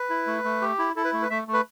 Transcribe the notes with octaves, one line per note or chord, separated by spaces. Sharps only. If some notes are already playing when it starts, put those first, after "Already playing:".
Already playing: B4
E4
A3
A3
G4
E4
E4 A4
B4
A3
B4
A3 E5
A3
B4